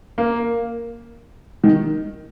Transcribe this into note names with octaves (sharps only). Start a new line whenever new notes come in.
A#3
D#3